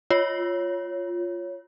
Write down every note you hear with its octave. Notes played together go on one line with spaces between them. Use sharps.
F4 C#5